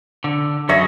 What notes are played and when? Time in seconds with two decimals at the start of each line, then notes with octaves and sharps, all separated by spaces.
0.24 D3
0.69 F#2 F#4 C#5 D#5 E5